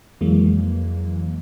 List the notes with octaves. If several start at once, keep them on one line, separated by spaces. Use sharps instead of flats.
F2 E3 F#3 G#3 A#3